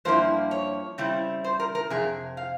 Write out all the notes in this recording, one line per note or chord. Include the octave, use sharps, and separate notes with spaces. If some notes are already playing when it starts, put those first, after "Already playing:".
G2 F3 A#3 E4 C5
C#5
C#3 G3 C4 E4
C5
A#4
A#4
F2 C3 G#4
F5